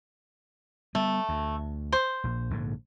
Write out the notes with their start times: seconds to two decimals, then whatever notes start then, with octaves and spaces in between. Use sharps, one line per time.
0.95 G3 A3 B3
1.29 D2
1.92 C5
2.24 A#1
2.50 A#1 G#2 D3